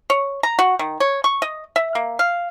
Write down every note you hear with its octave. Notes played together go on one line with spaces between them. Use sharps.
C#5
A#5
F#4
D#3
C#5
C#6
D#5
E5
A#3
F5